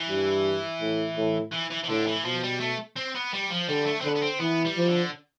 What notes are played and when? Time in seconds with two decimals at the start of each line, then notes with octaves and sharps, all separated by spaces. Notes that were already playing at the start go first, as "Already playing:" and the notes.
Already playing: E3
0.09 G2
0.81 A2
1.17 A2
1.53 E3
1.71 E3
1.84 E3
1.89 A2 D3
2.07 E3
2.25 B2 F3
2.43 G3
2.60 A3
2.96 C4
3.15 B3
3.33 G3
3.50 F3
3.68 D3 G3
3.86 A3
4.01 C4
4.04 D3 B3
4.15 B3
4.22 C4
4.40 E3 B3
4.65 G3
4.76 F3
4.88 D3